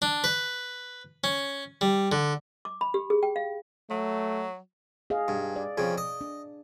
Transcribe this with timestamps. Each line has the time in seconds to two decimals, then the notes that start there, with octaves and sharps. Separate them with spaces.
0.02 D4
0.24 B4
1.24 C#4
1.81 G3
2.12 D3
2.65 D6
2.81 B5
2.94 G4
3.10 G#4
3.23 G5
3.36 F5
3.90 F#3 A3
5.10 G#4 D#5 F5
5.28 G2
5.56 D5
5.78 F2 C#3
5.98 D#5
6.21 D4